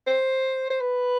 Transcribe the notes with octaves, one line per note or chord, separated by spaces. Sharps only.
C5
C5
B4